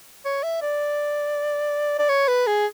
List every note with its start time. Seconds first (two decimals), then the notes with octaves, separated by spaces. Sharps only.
0.25 C#5
0.43 E5
0.62 D5
1.99 D5
2.09 C#5
2.28 B4
2.47 G#4